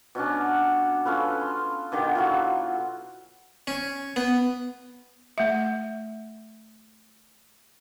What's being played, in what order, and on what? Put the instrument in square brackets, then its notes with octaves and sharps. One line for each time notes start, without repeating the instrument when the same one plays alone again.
[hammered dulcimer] B2 F#3 C#4 D4
C#4 F4 A4 B4
C6
B2 D3 D#3 G4
F#3 E4 F4
[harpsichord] C#4
B3
[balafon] A3 E5